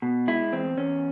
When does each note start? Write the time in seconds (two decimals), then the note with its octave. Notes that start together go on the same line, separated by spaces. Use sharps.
0.02 B2
0.28 G#3 E4
0.53 E2 C4
0.78 E2 C#4